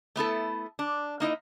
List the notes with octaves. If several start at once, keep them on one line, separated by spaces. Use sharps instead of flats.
A3 B3 E4 A4
D4
A#3 D#4 E4 D#5